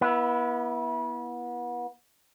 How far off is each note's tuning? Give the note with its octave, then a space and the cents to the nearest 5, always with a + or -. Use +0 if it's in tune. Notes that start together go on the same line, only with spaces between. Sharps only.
B3 -30 E4 +0